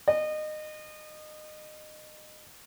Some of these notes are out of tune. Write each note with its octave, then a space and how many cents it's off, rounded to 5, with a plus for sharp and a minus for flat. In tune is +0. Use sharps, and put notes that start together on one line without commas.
D#5 -25